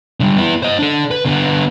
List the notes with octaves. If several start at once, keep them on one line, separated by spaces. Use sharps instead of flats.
D3 G3
B3 E4
C5 D#5
D4 A4
B4
D3 B3